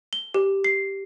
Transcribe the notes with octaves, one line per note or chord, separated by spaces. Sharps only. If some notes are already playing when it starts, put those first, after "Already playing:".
G7
G4
C7